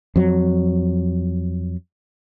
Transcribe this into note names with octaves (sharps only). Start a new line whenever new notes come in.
F2 F#3